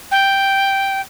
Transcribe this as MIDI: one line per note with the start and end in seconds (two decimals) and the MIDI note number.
0.11 1.01 79